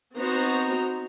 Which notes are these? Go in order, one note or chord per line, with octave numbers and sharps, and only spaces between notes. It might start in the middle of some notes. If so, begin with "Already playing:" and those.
B3 C4 D#4 F#4 C5 A#5